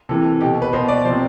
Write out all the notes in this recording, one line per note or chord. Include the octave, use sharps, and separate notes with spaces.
C3 E3 A4
B2 G4
B4
B2 C5
D5
C3 F3 C5